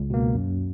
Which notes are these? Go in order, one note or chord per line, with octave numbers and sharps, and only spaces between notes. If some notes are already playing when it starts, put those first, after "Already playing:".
Already playing: C#2
B2 A#3
F#2